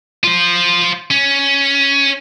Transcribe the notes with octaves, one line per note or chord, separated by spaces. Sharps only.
F4 C5
C#4